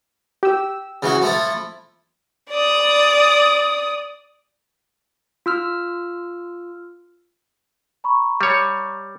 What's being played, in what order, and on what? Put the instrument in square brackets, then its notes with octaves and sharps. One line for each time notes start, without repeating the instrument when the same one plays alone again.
[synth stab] G4 E6
[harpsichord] C#3 E3 F#4
F3 A3 E4
[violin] D5 D#6
[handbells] F4 E6 F6
[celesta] A#5 B5 C#6
[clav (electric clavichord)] G3 C#5